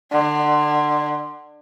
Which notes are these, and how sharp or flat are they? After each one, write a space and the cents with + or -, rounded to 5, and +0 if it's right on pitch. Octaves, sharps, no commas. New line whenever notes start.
D3 +25